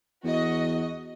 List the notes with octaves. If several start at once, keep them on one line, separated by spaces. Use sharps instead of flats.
E2 F#4 D#5